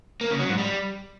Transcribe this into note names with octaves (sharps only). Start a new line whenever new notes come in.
A#3
C#3
F#3
G#2
G3